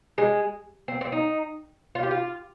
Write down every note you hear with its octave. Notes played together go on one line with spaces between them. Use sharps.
G#3
C4
C4
D#4
F4
G4
F4